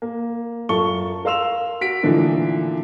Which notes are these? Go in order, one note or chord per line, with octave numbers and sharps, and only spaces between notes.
A#3
F#2 F4 A4 C#6 G7
A#4 F5 C6 E6 E7 F7
F#4 B6 D7
A#2 D3 E3 F3 A3 D#4